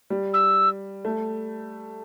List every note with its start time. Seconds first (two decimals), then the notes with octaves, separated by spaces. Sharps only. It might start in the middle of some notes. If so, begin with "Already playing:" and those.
0.10 G3
0.34 E6
1.05 A3